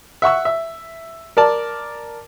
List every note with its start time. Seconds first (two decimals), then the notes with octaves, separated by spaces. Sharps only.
0.22 E5 F#5 C#6 E6
0.45 E5
1.37 A#4 D5 A5